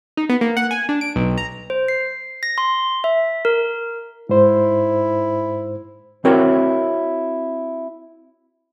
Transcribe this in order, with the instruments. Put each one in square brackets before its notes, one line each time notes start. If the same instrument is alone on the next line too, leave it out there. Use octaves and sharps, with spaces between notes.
[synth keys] D#4
B3
A#3
F#5
G#5
D4
D7
B1
A#5
[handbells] C5
C7
A#6
C6
E5
A#4
[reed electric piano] G#2 C5 [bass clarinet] E4
[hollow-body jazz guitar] C4 E4 F#4 A#4 C#5